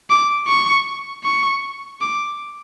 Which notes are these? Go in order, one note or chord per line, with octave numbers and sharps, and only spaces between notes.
D6
C#6
C#6
D6